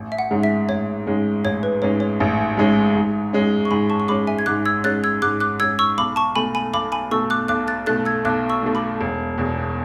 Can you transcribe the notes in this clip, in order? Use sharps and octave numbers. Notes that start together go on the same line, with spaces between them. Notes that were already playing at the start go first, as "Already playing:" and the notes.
Already playing: A1
E5
F#5
G#2 G#3 C#4
E5
A1 C#5
G#2 G#3 C#4
A1 C#5
B4
G#2 G#3 C#4 C#5
C#5
A1
G#2 G#3 C#4
G#2
G#3 C#4
C#6
G#2 G#5 B5
A5 C#6
C#6
G#3 C#4 B5 D6
E5 G#5
G#6
G#2 D6 F#6
E6 G#6
G#3 C#4 F#6 A6
E6 G#6
G#2 D6 F#6
D6 F#6
G#3 C#4 E6 G#6
C#6 E6
B1 B5 D6
A5 C#6
B2 A3 G#5 B5
G#5 B5
B1 B5 D6
G#5 B5
B2 A3 C#6 E6
D6 F#6
B1 D6 F#6
F#6 A6
B2 A3 F#6 A6
E6 G#6
B1 D6 F#6
C#6 E6
B2 A3
B5 D6
E1
E2 B2